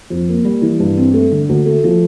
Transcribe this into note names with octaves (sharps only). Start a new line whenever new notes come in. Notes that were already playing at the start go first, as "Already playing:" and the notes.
F2
A#3
G3
E3
G2
C4
A3
D3
D2
A3
F3